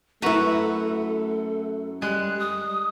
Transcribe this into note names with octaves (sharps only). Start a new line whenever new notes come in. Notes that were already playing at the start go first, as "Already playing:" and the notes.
F#2 A3 E4 F#4 A4 B4 A#5
G3 G#3 F#6
G3 D#6